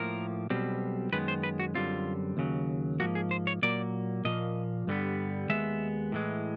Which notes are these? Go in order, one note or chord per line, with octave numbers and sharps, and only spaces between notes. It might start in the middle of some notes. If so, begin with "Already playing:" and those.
Already playing: A2 F3 A#3 A#4
B1 B2 G3 C4
F#2 D#3 G#3 B3 B4
C5
B4
F#4
F#2 D3 G3 C4 F4
D#2 C#3 F#3
G#2 F3 A#3 F#4
G#4
C5
C#5
A#2 F#3 A#3 D5
A#2 F3 A#3 D#5
G2 D3 G3 B3
D#2 D#3 G#3 B3 E5
A2 E3 G#3